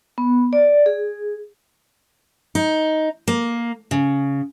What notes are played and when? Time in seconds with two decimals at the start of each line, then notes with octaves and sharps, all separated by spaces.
0.18 B3
0.53 D5
0.86 G#4
2.55 D#4
3.28 A#3
3.91 C#3